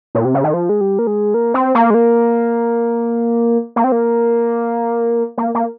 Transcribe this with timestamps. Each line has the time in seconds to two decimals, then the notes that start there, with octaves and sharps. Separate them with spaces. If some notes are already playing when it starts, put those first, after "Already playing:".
0.15 A#2
0.25 C3
0.34 C#3
0.44 D#3
0.54 F3
0.69 G#3
0.81 G3
0.99 A#3
1.07 G#3
1.34 A#3
1.54 C4
1.75 A#3
1.90 G#3
1.94 A#3
3.76 A#3
3.84 C4
3.92 A#3
5.38 A#3
5.55 A#3